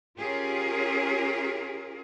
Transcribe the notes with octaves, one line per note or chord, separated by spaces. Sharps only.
C#4 F4 G4 G#4 A#4